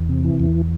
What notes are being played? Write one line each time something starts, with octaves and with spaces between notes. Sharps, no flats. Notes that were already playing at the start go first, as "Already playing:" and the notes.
Already playing: E2
C3
E3
E2